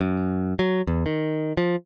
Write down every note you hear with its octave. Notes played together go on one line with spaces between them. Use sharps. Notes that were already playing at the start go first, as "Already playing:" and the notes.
F#2
F#3
E2
D#3
F3